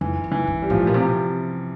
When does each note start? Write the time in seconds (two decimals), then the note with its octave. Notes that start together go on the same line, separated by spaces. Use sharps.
0.01 F2 E3
0.24 F2
0.31 E3
0.47 G2
0.62 G3
0.70 A2 F3
0.80 G3
0.87 A#2
0.94 C3